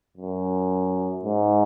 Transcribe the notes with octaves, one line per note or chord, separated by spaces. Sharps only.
F#2
G#2